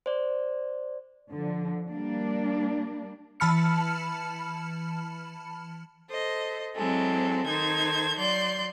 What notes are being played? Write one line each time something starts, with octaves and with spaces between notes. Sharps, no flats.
C5 D5
D3 F3
G3 A#3 D4
E3 A5 B5 F6 C#7
A4 C5 D#5
F#3 G#3 C4 E4 A4
D#3 D#4 A4 C5 G#6
F#3 D5 C6 G6